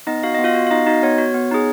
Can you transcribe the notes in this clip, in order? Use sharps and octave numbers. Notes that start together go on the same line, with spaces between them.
B3 D#4 D#5
F#4 F5
B3 D#5
F4 F5
F#4
F5
B3 D#4 D#5
D#4 F#4 D#5
B3 C#5
F#4
B3
D#4 G#4